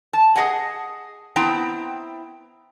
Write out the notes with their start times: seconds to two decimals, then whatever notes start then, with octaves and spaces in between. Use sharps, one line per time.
0.13 A5
0.36 G#4 A#4 D#5 F#5 G#5
1.36 B3 C4 E4 G5 A#5